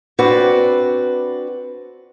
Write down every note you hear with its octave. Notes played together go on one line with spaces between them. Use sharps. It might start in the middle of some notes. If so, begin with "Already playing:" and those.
C4 D4 F#4 B4 D5